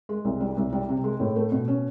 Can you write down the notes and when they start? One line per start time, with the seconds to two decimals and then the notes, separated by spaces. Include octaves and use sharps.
0.09 G#3
0.25 C2
0.40 G3
0.57 C2
0.73 G3
0.89 C3
1.04 G#3
1.20 A2
1.36 A3
1.52 B2
1.68 C#4